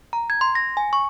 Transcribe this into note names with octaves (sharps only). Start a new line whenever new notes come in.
A#5
G#6
C6
A#6
G#5
C#6